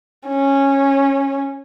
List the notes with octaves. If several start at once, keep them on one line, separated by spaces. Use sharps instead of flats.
C#4